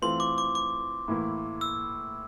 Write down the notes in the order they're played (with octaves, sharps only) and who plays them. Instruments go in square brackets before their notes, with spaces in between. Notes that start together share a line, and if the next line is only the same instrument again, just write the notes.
[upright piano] E3 A3 C4 F4 [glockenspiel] C6
[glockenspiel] D6
D6
D6
[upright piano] A2 E3 A#3 E4
[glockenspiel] E6